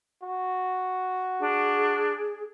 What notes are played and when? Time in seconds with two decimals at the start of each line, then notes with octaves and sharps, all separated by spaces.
0.23 F#4
1.40 D4 G#4